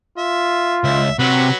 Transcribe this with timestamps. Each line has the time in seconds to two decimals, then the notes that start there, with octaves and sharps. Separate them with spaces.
0.18 F4 E5
0.84 C#2 E5
1.19 C3 F#3 F#4 B4